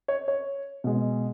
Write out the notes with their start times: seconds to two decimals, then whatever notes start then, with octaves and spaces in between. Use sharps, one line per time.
0.08 C#5
0.28 C#5
0.84 B2 G#3